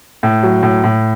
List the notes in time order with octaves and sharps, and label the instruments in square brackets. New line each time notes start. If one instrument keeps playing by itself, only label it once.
[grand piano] A2
F#3
A2
A2